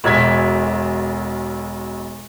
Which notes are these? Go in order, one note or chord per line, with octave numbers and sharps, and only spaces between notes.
E1 B1 G#6 B6